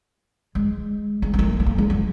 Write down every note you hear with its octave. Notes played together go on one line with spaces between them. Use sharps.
G#3
G#3
B3
A#3
G#3
A#3
G#3
F#3